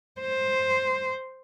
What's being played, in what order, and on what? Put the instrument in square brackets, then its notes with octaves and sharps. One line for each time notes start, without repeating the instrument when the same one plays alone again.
[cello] C5